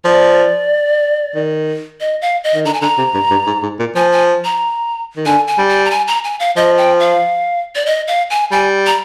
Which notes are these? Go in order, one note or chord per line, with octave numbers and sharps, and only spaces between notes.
F3 D5
D#3
D#5
F5
D#5
D#3
D3 A#5
G#5
D3 A#5
C3
G2
G2
G#2
G#2
A#2
F3 G#5
G#5
A#5
D#3
D3 G#5
G#5
G3
G#5
A#5
G#5
A#5
G#5
F5
F3 D#5
G5
F5
D5
D#5
F5
G#5
G3 G#5
A#5